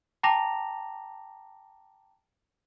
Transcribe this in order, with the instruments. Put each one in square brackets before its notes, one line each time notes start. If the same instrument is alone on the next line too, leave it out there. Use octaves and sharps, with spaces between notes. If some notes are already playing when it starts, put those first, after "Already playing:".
[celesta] G5 A5 A#5 D6 A#6 F7